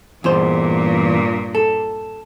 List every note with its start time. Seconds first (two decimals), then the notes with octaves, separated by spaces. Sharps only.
0.24 E2 G2 A#2 C5
1.55 A4